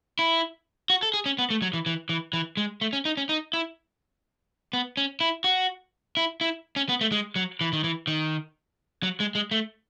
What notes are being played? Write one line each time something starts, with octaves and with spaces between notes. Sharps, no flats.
E4
F#4
A4
G#4
C#4
B3
A3
F#3
E3
E3
E3
E3
G#3
A3
C#4
D#4
C#4
D#4
E4
B3
C#4
E4
F#4
E4
E4
C#4
B3
A3
G#3
F#3
E3
D#3
E3
D#3
F#3
G#3
G#3
A3